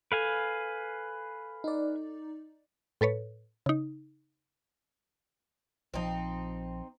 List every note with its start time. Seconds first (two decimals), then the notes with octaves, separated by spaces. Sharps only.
0.12 A4 B4 F5 G#5
1.64 D#4 D5
3.01 A2 A4 B4 C#5
3.66 C#3 D#4
5.94 A#1 F3 C4 D#4